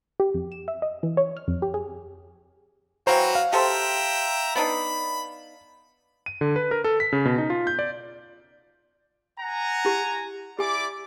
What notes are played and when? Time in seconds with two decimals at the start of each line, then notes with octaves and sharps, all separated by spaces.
0.20 G4
0.34 F2
0.52 E7
0.68 E5
0.82 D#5
1.03 E3
1.17 C#5
1.37 F6
1.48 F2
1.62 G4
1.74 G#4
3.07 E3 F#3 F#4 C5 C#5 F5 G5 A#5
3.35 F5
3.53 G4 A4 C5 E5 G5 A#5
4.55 B3 D4 D#4 B5
6.26 D#7
6.41 D3
6.56 B4
6.71 A#4
6.84 A4
7.00 B6
7.13 C#3
7.25 B2
7.38 D#4
7.50 F4
7.67 G6
7.79 D5
9.40 F#5 G#5 A#5
9.85 E4 G4
10.59 E4 G4 D5 G#5 D6